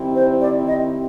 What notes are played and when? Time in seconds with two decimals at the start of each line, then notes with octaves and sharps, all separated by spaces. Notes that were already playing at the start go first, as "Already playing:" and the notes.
Already playing: D#3 G3 C4 E4 G4
0.15 C5
0.41 D5
0.67 D#5